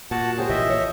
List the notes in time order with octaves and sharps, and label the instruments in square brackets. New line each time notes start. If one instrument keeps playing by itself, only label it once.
[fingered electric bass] A#2 [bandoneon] F#4 F#5 A5
[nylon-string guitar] C#3 G4 C5 [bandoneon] G#4
[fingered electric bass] A#1 A#2 E3 [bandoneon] D#5 E5
[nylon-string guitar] C#5